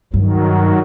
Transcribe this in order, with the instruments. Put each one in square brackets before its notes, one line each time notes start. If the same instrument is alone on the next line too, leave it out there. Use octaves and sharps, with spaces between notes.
[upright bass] G2 [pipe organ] D#3 F#3